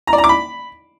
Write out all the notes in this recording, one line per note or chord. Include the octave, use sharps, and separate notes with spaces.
A#5
D5
A#5
D6
B5